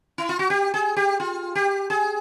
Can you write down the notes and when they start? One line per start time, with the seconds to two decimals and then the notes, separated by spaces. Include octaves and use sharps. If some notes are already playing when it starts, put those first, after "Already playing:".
0.18 E4
0.29 F4
0.39 F#4
0.50 G4
0.74 G#4
0.96 G4
1.20 F4
1.55 G4
1.90 G#4